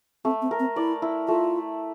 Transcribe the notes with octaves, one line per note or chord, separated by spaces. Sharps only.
A3 C4
C4
A#4
C4
E4 D5
E4
A3 F4